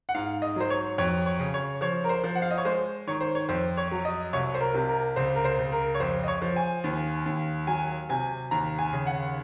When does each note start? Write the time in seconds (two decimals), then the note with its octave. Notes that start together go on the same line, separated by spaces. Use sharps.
0.09 F#5
0.14 G#2 F5
0.42 D#5
0.56 F#3 C5
0.70 C#5
0.98 F2 C#5
1.26 C#5
1.39 C#3
1.54 C#5
1.81 F3 C#5
2.04 A#4
2.09 C5
2.24 F3
2.35 F#5
2.42 F5
2.51 D#5
2.58 C#5
2.65 G#3 C5
3.07 D#3 C#5
3.21 C5
3.35 C#5
3.49 F2 C5
3.77 C#5
3.91 F#3
4.05 D#5
4.33 C2 C#5
4.54 C5
4.61 A#4
4.74 C3
4.89 A#4
5.16 C#2 C5
5.35 A#4
5.45 C5
5.59 C#2
5.72 A#4
5.95 C#5
6.00 F2 C5
6.24 D#5
6.28 C#5
6.42 F3
6.56 G#5
6.84 D#2
7.26 D#2
7.67 F#3 G#5
8.09 C3 G#5
8.51 D#2 A#5
8.79 G#5
8.93 C#3
9.07 F#5